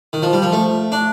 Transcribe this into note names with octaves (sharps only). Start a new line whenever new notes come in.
D#3
F3
G3
F3
A3
D4